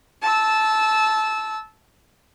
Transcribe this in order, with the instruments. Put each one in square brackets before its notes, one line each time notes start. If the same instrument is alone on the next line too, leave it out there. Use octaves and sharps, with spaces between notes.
[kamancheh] A5 E6